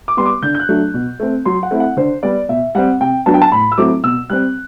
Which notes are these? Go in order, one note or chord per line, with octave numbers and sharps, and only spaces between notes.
D6
G3 B3 C6
D6
D3 G6
G6
F#6
F#3 A3 D4
B2
A3 C4
F#3 C6
F#5
A3 C4 E4
F#5
D3 C5
G3 B3 D5
B2 E5
G3 C4 F#5
C3 G5
F#3 B3 D4 A5
G5
A5
A2 B5
E6
F#3 A3 C4 E4 D6
B2 E6
G3 C4 F#6